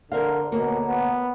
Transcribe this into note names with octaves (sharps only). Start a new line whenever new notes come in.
D3 A#4 C5 F5
D2 B2 A#3 C#5
B3